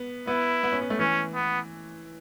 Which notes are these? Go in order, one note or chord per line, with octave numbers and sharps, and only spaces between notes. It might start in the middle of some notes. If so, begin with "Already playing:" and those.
Already playing: B3
B3 E4
B3
C#4
B3
A3
E3 C#4
B3